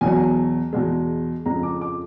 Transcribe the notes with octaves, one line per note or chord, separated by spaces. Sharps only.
E2 B2 F#3 G#5
E2 B2 G#3
F2 C#3 F3 G#3 A#5
D6
D6